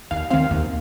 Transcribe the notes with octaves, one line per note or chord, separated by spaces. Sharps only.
D#2 F5
D#3 C4 F5
D#2